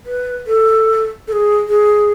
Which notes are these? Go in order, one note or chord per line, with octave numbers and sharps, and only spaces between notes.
B4
A4
A4
G#4
G#4